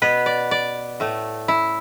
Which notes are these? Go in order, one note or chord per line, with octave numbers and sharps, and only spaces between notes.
B2 B3 B4
D5
D5
A2 A3
E4